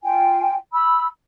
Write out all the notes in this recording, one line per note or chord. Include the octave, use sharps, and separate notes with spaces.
F4 G5 G#5
B5 E6